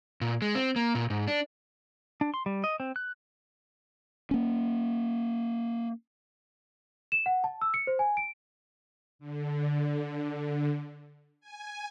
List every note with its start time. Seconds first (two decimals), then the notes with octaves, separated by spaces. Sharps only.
0.21 A#2
0.42 G#3
0.55 C4
0.76 A#3
0.95 A#2
1.10 G#2
1.28 D4
2.21 D4
2.34 C6
2.46 G3
2.64 D#5
2.80 C4
2.96 F#6
4.31 A#3 C#4
7.12 E7
7.26 F#5
7.44 A5
7.61 E6
7.74 C#7
7.87 C5
7.99 G#5
8.17 D7
9.19 D3
11.40 G#5